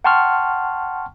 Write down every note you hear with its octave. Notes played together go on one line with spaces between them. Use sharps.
F#5 G5 A5 C6 C#6 F6